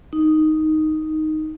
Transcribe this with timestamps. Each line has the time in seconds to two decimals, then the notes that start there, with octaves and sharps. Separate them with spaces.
0.13 D#4